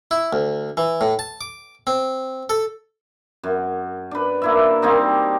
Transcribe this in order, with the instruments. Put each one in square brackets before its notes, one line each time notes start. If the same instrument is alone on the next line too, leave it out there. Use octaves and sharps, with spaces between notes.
[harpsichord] E4
D2
E3
A2
A5
D6
C4
A4
[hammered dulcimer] F#2
D4 B4
A#3 E4 E5
G3 A#3 C4 D#4